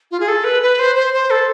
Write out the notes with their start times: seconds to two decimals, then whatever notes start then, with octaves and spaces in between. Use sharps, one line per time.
0.11 F4
0.20 G#4
0.28 A4
0.44 B4
0.62 B4
0.79 C5
0.96 C5
1.14 C5
1.31 A4